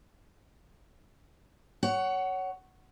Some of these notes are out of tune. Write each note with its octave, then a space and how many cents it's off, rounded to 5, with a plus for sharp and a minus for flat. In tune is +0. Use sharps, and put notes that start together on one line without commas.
C#5 +10 F#5 +20